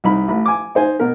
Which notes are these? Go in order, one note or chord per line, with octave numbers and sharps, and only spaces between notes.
C2 D#4 B5
A1 B5
G#5 D6
D#4 C5 G#5
B2 A#4